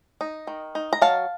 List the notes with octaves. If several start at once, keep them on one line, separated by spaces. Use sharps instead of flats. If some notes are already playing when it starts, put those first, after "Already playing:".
D#4
D#3
D#4
A#5
F#3 F5 A5